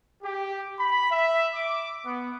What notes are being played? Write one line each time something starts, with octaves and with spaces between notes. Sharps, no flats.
G4
B5
E5
D6
B3